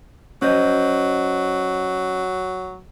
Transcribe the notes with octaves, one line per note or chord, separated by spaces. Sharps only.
F#3 C#4 C5 D#5